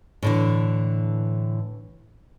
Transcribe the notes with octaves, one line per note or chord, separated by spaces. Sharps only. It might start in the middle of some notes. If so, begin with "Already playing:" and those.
A2 D3 E3